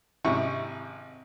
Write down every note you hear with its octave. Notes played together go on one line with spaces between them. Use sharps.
G#1 C3 E4 C#6